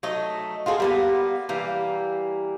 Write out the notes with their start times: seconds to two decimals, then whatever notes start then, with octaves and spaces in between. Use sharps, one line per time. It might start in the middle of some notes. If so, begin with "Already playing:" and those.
0.03 F#3 A3 D#4 D#5
0.66 F4 F#4 G#4 A4
0.80 G3 A#3 B3
1.49 E3 G3 A#3